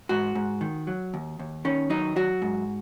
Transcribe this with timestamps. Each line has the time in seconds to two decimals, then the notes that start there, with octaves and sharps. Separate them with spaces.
0.09 G#2 F#4
0.35 G#2
0.61 D#3
0.87 F#3
1.14 D#2
1.39 D#2
1.65 D#3 C#4
1.90 F#3 D#4
2.16 F#3 F#4
2.42 G#2